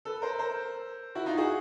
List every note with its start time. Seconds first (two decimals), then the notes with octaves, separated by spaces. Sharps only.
0.05 A4 B4
0.22 A#4 C5
0.39 A#4 C5
1.15 E4 F#4
1.26 D#4 F4
1.37 F#4 G#4